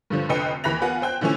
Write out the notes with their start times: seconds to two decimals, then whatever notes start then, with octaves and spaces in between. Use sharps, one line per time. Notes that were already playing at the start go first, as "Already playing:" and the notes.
0.10 G2 D3 F3
0.29 F1 D3 B4 D#5 G5 C#7
0.64 D#2 E3 B5 F#6 A#6 F7
0.82 B3 F4 F#5 G#5
1.02 C5 G5 F#6
1.21 D3 E3 F3 A3 C#4 E4